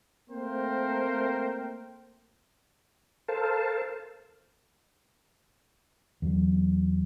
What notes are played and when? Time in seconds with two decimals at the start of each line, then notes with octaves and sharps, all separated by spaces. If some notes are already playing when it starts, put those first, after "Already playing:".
0.31 A3 A#3 C4 A#4 C5 G5
3.28 A4 A#4 C5 F5 A5
6.22 E2 F#3